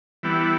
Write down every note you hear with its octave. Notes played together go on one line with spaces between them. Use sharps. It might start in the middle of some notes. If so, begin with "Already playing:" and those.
E3 G3 B3 E4